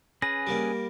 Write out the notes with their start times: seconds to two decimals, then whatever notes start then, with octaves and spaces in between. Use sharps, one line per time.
0.22 C#4 G#4 B4 A#6
0.47 G3 A#3